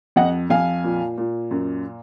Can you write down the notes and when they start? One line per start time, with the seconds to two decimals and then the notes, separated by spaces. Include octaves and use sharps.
0.16 F2 D#5 F#5
0.50 F2 F5 G#5
0.84 A#2
1.18 A#2
1.51 F#2